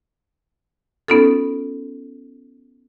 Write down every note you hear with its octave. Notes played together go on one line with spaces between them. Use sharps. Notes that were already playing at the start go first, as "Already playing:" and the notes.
B3 C#4 D#4 F4 A4